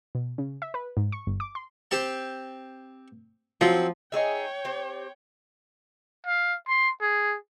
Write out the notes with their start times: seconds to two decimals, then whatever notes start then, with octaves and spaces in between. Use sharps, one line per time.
0.15 B2
0.38 C#3
0.62 E5
0.74 B4
0.97 G#2
1.12 C#6
1.27 G1
1.40 D6
1.55 C6
1.91 C4 G4 A5
3.61 F3 F#3 C4
4.12 D#4 G#4 C#5 E5 G5
4.65 C4 G4
6.27 F5
6.67 C6
7.01 G#4